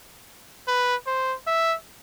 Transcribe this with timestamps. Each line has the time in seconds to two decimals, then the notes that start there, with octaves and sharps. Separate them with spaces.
0.68 B4
1.07 C5
1.47 E5